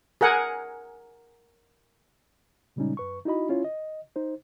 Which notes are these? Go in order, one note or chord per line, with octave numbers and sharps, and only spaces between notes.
G#4 A#4 F#5 G#5
A#2 C#3 G3 G#3 C#4 D#4
F#2 B4 C#6
D#4 E4 F#4 D#5 B5
C#4 E4 F4 C#5
D#5
D#4 C5